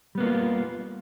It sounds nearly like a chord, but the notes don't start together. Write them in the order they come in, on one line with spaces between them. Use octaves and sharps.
G3 B3 A#3 F#4 F4